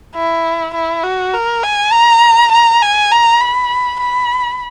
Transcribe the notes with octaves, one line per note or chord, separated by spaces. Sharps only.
E4
E4
F#4
A#4
G#5
A#5
A#5
G#5
A#5
B5
B5